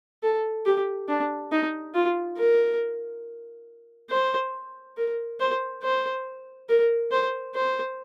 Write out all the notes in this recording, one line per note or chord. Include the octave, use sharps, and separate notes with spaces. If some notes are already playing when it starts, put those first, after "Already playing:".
A4
G4
D4
D#4
F4
A#4
C5
A#4
C5
C5
A#4
C5
C5